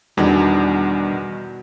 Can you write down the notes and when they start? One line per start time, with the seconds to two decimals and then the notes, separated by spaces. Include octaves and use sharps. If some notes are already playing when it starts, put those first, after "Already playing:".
0.17 E2 B2 D#3 E3 G3 D4 G#4 D5